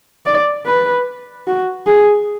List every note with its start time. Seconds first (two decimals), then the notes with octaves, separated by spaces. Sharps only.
0.26 D5
0.66 B4
1.47 F#4
1.87 G#4